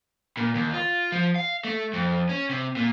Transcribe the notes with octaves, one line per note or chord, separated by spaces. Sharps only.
A#2
D#2
F4
F3
F5
A3
F2
C#4
C3
A#2